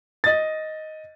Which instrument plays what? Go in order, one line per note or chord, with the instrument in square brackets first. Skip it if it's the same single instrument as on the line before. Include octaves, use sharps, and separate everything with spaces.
[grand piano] D#5 A6